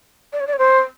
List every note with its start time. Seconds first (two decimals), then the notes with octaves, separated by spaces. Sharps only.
0.33 D5
0.40 C#5
0.47 D5
0.53 C#5
0.58 C5